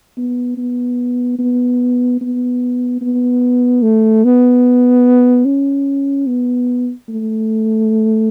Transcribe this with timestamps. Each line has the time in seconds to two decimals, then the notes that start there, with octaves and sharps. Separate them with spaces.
0.17 B3
0.58 B3
1.39 B3
2.21 B3
3.01 B3
3.82 A3
4.24 B3
5.45 C#4
6.27 B3
7.09 A3